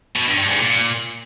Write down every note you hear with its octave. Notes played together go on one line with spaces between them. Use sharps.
B2
G2
G2
G#2
A#2